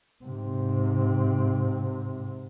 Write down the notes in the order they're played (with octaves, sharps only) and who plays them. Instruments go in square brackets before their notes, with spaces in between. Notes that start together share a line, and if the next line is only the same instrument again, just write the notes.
[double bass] G#2 C3